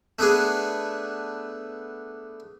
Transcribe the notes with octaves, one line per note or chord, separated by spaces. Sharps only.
A3 B3 D4 G#4